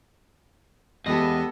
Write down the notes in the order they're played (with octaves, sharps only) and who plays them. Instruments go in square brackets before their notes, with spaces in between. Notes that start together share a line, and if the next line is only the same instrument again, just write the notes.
[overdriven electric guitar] E2 [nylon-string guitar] G#3 G4 [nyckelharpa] B3 A4 [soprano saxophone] D#5